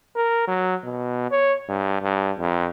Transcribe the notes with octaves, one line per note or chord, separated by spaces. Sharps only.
A#4
F#3
B2
C#5
G2
G2
F2